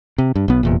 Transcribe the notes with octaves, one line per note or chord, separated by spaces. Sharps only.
C3
G2
B1 B3
F1 E2 A#2